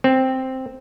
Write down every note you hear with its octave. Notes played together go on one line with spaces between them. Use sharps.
C4